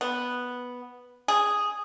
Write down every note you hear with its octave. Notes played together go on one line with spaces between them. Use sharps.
B3
G#4